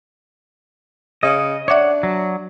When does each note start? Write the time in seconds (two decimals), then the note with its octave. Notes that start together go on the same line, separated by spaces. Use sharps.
1.23 C#3 D#5
1.68 D4 C#5 D5 E5 F#5 D6
2.03 F#3